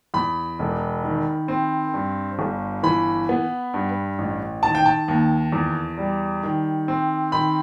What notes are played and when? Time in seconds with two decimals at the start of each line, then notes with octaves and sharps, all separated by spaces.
0.14 E2 B5
0.59 E1
1.04 D#3
1.48 C4
1.94 G2
2.39 G1
2.83 E3 B5
3.29 B3
3.74 G2
4.18 A1
4.63 D#3 A5
4.75 G5
4.86 A5
5.08 D#2
5.52 E2
5.98 G3
6.43 D#3
6.88 C4
7.32 D#3 B5